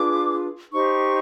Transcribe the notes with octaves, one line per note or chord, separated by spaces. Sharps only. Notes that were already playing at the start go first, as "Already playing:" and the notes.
Already playing: D4 F4 G#4 B4 D6
D#4 G4 C5 C#6